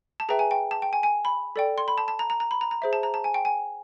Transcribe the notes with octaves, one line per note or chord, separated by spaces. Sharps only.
A5
G#4 B4 E5 G5 A#5
G#5
G5
A5
G5
G#5
G#5
B5
A4 D5 G5
C6
B5
A5
A5
A#5
A#5
A#5
B5
A#5
A#5
G#4 C5 E5
A5
A#5
A5
G#5
G5
G#5